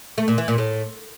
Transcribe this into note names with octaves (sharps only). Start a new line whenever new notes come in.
A3
A#2
E3
A#2
A2